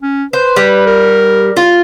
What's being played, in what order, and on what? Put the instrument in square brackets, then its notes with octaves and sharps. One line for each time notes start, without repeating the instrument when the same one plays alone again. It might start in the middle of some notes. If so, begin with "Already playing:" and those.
[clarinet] C#4
[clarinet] B4 [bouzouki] C5
[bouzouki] G3
[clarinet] A#4
[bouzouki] F4